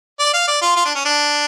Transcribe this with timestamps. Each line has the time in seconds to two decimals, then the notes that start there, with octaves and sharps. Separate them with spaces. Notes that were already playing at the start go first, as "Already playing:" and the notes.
0.19 D5
0.33 F5
0.47 D5
0.62 F4
0.76 F4
0.85 D4
0.95 C#4
1.05 D4